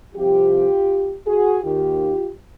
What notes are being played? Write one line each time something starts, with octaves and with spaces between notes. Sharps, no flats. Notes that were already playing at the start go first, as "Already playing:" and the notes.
C2 C3 F3 F4 G4
F#4 G#4
D#2 D#3 F4 G4